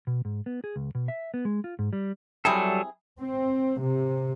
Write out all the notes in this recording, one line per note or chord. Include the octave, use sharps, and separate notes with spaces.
B2
G#2
B3
G#4
C#2
B2
E5
B3
G#3
F4
G#2
G3
C3 F#3 G3 E4 G#4 A4
C4
C3